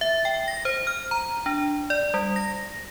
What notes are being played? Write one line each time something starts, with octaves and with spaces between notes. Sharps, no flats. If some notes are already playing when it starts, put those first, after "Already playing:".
E5
G5
A#6
C5
F6
A#5
D4
D5
G3
A#6